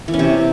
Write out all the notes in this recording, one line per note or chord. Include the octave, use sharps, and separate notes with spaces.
E3
C#4
C3